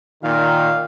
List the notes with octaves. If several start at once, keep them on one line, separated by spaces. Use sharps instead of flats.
A#2 D#3 F5